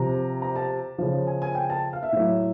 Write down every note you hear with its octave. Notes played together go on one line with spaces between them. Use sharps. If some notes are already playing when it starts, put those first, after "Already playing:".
Already playing: C3 F3 A#5
A#5
A5
C#3 F3
G#5
G#5
G5
A5
F5
E5
A2 F#3